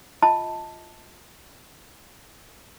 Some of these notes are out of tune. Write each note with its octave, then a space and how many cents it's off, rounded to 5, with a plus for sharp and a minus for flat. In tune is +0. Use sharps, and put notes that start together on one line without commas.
F4 +0 D#5 +30 A5 +5